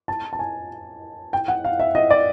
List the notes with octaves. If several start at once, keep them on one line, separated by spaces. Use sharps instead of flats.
A5
A5
G#5
G5
F#5
F5
E5
D#5
D5